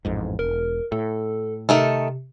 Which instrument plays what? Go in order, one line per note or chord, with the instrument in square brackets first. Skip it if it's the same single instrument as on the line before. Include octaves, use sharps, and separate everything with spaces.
[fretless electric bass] A1 F2 G#2
[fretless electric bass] E1 [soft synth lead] A#4
[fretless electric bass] A2 [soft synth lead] A4
[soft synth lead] C3 [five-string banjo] D#3 A3 A4